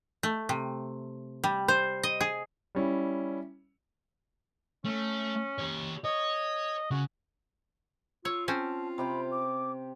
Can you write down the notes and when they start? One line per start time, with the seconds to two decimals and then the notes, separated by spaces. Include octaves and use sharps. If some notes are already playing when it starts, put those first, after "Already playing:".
0.23 A3
0.49 C3
1.44 G3
1.68 C5
2.03 D#5
2.21 G#4
2.75 G3 C#4 E4
4.85 A3 C#4
5.59 G4 C#5
6.05 C#5 D#5
6.91 C#3 F#4
8.25 F4 C#5 E6
8.48 C4 C#4 A5
8.98 C3 G4 G5 B5
9.31 D6